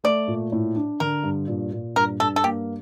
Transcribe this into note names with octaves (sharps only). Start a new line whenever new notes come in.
A3 D5
A#2
A2
D4
D3 A#4
G2
A#2
A#2
G2 A#4
G2 A4
A4
A#3 G4